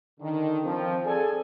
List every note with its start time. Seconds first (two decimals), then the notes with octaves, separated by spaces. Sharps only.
0.20 D3 D#3
0.64 F3 C4
1.05 G#4 A4 D5 G#5